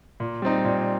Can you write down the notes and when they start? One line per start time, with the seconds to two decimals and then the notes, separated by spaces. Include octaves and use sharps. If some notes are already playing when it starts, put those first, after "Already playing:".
0.20 A#2
0.42 G3 C4 D#4
0.64 A#2